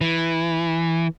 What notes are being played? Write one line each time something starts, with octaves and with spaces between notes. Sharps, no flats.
E3